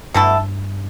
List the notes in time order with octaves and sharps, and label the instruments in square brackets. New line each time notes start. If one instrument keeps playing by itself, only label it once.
[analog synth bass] G2 [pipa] B2 A3 E4 A4